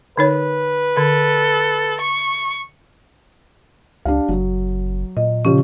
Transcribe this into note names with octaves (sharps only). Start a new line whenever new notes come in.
D3 D#4 B4 C#5
D3 A4
C#6
C#2 D4 G4 F5
F#1 F#3
A#2 D#5
C#3 F3 C#4 G4